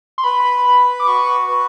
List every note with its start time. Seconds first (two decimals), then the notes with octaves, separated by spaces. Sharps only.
0.18 C6
0.24 B4 B5
0.66 B4
1.00 D6
1.07 F#4 C#6
1.48 B4